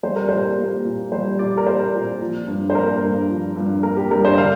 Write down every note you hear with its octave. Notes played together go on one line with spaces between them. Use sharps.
G3 C5
A#4
A#2 C5
A#3
A#2
G3 C5
A#2 D5
A#4
A#3 C5
A#2
F3
G2
C5
A#3 A#4
G2
F3
G2
A#3 A#4
G4
G2 A#4
C5
D3 F5